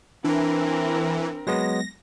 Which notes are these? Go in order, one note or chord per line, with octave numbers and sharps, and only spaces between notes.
E3 C4 D4 A#4
F#3 G#3 B3 A#6